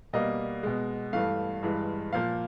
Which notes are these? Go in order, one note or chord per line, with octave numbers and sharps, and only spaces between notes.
B2 G3 A#3 D#5
B2 G#3
G2 E3 A3 F5
G2 E3 G#3
A#2 F3 A#3 F5